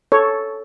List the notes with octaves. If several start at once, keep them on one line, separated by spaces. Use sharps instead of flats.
A4 C#5